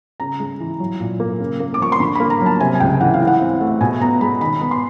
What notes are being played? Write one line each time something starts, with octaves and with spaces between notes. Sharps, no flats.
C#3 A#5
G#3
E3
F#3
A#2
A#3
C#3
A#3
D6
F3 C#6
C6
D3 B5
B5
A#3
A#5
F#3 A5
C3 G#5
G#5
C#2 G5
E3 F#5
F5
E3
F#5
C4
A3
B2 G#5
B3 A#5
G#3 B5
D#3 B5
B3 B5
C6